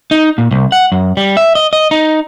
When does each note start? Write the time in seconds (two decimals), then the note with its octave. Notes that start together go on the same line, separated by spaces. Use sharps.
0.11 D#4
0.38 A#2
0.51 C2
0.72 F#5
0.92 F#2
1.17 G3
1.37 E5
1.55 D#5
1.73 D#5
1.91 D#4